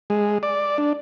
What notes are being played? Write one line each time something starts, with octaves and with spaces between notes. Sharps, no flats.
G#3
D5
D4